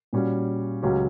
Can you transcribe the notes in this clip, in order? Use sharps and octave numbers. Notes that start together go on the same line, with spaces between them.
A#2 G3 C#4 F#4
C#2 C#3 F#3 C#4 G4